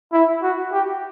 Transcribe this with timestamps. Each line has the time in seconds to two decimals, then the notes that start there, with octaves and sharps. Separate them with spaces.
0.13 E4
0.42 F#4
0.72 G4